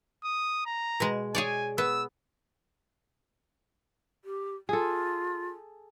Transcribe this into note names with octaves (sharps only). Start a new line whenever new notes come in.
D#6
A#5
B2 G#3
G#4 C#5 D5 G#5
B3 E6
G4
F4 G#4 A4